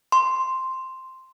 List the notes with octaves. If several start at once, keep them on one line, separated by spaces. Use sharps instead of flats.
C6